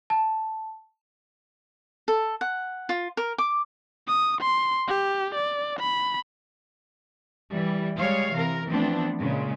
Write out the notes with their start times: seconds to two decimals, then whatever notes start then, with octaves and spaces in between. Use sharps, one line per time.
0.10 A5
2.08 A4
2.41 F#5
2.89 F4
3.17 A#4
3.38 D6
4.07 D#6
4.41 C6
4.88 G4
5.35 D5
5.79 B5
7.51 E3 G3
8.00 G3 G#3 C#5 F5
8.32 C3 E3 A#4
8.67 E3 F3 A3 B3 C4 D4
9.19 A#2 C#3 G#3